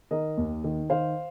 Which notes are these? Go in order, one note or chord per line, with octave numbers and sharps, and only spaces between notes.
D#3 A#4 D#5
D#2
D#3
D#3 C5 F5